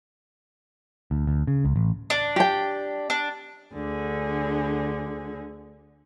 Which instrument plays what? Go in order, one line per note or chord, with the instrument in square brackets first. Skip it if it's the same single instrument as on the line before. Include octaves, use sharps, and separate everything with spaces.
[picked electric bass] D2
D2
C#3
C#2
A1
[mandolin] D4
[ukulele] G4 G5
[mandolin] D4
[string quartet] D2 D3 G#4